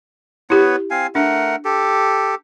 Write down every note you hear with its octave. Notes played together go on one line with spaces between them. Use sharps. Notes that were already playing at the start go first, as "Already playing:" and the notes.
B3 E4 G4 B4 C#5
C4 F5 G#5
A3 D4 A#4 F#5
G4 A4